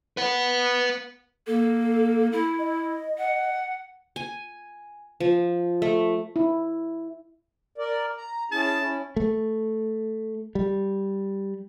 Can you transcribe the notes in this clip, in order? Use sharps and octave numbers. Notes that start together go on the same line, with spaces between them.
B4 F#5
A#3 A4
E4
D#5
F#5
G#5
F3
A3
E4
A#4 D5
A#5
C#4 E4 G#4 A5
C#4 E4
A3
G3